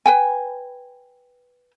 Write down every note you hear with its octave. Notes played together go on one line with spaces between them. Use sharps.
B4 G5 G#5